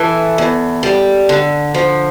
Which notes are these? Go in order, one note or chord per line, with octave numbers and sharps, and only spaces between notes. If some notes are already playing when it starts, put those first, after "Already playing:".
Already playing: E3 A4
E2
G3
D3
F3